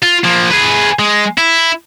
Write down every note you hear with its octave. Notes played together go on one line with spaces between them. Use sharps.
F4
F3 A#3
G#4 B4
G#3
E4